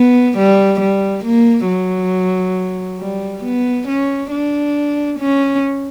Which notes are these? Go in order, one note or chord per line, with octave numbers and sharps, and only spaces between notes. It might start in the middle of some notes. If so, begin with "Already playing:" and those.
Already playing: B3
G3
G3
A#3
F#3
G3
B3
C#4
D4
C#4